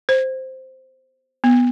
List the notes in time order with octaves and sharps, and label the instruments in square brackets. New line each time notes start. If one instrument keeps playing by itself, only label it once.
[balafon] C5
B3